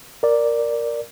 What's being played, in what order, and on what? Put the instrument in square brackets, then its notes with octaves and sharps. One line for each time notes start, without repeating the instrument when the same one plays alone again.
[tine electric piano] A#4 D5